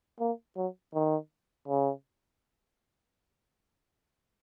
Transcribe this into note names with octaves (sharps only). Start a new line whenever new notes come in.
A#3
F#3
D#3
C#3